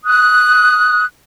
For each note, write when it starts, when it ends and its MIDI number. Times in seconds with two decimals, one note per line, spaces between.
0.05 1.03 87
0.05 1.03 90